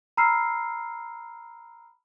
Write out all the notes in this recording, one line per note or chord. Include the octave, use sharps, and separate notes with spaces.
A#5 B5 E6 F6 C7